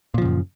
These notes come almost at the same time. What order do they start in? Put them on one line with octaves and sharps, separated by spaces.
A#2 F3 C#3 F#2